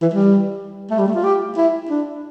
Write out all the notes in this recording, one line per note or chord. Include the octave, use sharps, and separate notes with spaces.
E3
G3
A3
G3
A3
F4
G4
E4
D4